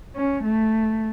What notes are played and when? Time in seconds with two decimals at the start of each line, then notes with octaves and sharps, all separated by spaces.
0.15 C#4
0.43 A3